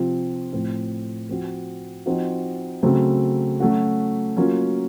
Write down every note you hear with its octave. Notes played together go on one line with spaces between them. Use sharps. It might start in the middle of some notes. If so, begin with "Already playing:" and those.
Already playing: C3 F3 C4 F4
A2 F3 C4
F3 C4 F#4
F3 C4 D#4 F#4
C#3 F#3 A3 C4
F#3 A3 C#4 F#4
F#3 A#3 C#4 F4